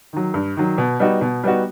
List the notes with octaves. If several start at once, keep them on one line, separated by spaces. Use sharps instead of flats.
D#3 F#3
G2
D#3 F#3
B2
G3 B3 D#4 F#4
B2
G3 B3 D#4 F#4